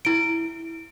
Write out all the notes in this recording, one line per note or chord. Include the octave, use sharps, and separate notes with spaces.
E4 D7